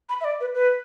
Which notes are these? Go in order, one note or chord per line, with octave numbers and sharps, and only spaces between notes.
B5
E5
D5
B4
B4